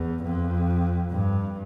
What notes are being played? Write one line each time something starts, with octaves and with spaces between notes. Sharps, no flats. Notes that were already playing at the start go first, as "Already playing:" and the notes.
Already playing: E2
F2
G2